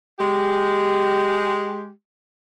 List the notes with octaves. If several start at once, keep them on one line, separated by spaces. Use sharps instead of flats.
G#3 G4